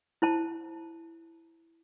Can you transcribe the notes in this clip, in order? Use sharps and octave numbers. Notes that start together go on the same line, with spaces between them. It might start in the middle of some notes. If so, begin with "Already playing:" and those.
E4 C5 A5